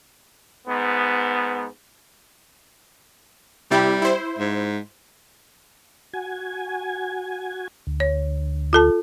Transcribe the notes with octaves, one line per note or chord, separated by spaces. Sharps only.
G#2 B3
C3 G3 E4 G4
E4 C5
G#2
F#4 G#5
D2
C#5
F4 A4 A5